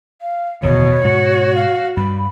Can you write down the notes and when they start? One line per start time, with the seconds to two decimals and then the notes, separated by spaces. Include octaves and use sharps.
0.22 F5
0.63 D1 E2 B2 D#3 C#5
1.04 G#2 B2 F#4
1.56 F5
1.97 G2 G3 B5